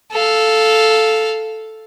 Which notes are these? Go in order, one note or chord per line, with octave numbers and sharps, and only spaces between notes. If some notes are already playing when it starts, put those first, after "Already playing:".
A4 F5